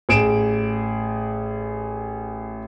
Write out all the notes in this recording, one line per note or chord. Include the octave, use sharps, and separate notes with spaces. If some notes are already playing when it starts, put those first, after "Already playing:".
A1 G#4 D7 E7